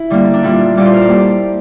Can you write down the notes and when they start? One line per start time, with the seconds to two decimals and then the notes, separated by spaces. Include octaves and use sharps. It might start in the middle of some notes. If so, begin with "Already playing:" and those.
Already playing: E4
0.10 D3 G3 A#3
0.34 D4
0.43 A#2 G3 A#3 E4
0.76 A#2 G3 A#3 D5
0.85 C5
0.93 A#4
1.02 A4
1.09 G3 A#3 G4